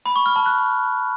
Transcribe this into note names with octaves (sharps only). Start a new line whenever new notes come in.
B5
C#6
F6
A5
F#6